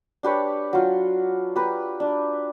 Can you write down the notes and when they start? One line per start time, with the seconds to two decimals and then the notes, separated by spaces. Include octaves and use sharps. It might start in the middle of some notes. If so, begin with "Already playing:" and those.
0.23 D4 G4 B4 C#5
0.73 F#3 F4
1.56 G4 B4 A#5
2.00 D4